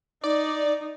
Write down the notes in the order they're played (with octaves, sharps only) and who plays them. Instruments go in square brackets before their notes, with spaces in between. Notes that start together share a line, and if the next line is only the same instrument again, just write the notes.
[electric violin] D#4 [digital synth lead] D5